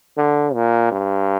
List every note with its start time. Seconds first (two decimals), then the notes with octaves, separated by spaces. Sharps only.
0.17 D3
0.54 A#2
0.91 G2